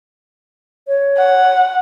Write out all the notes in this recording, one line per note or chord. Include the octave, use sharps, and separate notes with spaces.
C#5
F#5